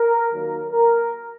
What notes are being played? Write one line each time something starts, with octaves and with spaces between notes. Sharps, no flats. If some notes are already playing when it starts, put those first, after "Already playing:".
Already playing: A#4
D#2 D#3 F#3 A#3 A#4
A#4